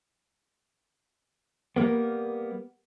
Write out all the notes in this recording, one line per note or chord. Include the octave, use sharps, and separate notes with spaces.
G3 A#3 B3